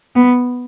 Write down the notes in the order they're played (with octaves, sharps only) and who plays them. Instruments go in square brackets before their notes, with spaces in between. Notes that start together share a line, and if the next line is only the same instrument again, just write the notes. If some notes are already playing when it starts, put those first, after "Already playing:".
[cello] B3